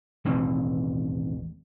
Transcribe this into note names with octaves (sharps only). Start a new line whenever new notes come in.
E1 A1 D#2 C4